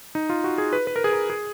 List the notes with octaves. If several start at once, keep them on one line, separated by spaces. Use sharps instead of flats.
D#4
F4
F#4
G#4
B4
B4
A#4
G#4
A#4
G#4